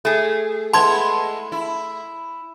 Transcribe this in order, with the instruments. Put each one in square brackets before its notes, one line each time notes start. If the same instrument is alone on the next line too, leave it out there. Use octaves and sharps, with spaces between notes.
[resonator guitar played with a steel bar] A3 G#4
[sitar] G#3 B3 E4 [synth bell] A5 C6 G#6
[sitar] E4